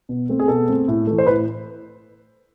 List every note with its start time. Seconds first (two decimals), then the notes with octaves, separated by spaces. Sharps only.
0.09 B2
0.29 A3 C4
0.39 G#4
0.48 B2 A4
0.68 A3 C4
0.88 A2
1.07 E3 A3
1.18 C5
1.27 A2 B4